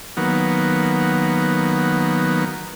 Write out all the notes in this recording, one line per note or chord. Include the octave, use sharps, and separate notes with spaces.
D#3 F#3 A#3 B3